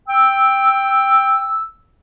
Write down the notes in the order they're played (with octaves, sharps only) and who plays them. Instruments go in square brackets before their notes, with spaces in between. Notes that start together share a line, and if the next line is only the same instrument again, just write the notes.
[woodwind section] G5 E6